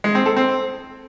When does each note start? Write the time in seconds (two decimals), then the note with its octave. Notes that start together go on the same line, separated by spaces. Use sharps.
0.04 G#3
0.15 C4
0.26 A4
0.37 C4